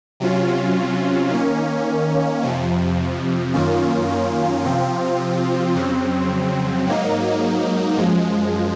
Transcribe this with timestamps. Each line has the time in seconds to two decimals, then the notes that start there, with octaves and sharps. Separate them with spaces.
0.20 C3 F#3 C#4 F4
1.31 D#3 A#3 C#4
2.43 F2 C3 F3
3.54 F#2 D#3 A#3 C#4 F4
4.64 C3 F3 C4 F4
5.75 F2 C#3 F#3 C4
6.87 G#2 F#3 A#3 D#4
7.98 F#2 F3 G#3